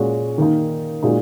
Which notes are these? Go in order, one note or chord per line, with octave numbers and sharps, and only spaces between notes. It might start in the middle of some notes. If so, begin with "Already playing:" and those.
Already playing: A#2 G#3 C#4 F#4
D#3 A#3 D#4
A#2 G#3 D#4 F#4